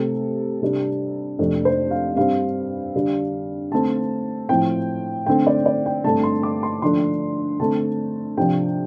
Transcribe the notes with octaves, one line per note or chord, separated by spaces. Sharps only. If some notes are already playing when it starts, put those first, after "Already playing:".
Already playing: C3 A3 C4 A4
C3 G3 D4
F2 C3 A3 D4
C5
F5
G2 G3 C4 F5
D3 G3 D4
D3 A3 C4 A5
A2 F3 C4 G5
D3 A3 C4 G5
D5
D5
G5
G2 D3 A3 C4 A5
C6
D6
C6
D3 F3 A3 D4 C6
D3 A3 C4 A5
C3 F3 D4 G5